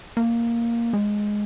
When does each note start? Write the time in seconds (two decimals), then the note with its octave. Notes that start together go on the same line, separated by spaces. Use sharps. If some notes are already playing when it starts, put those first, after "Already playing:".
0.17 A#3
0.93 G#3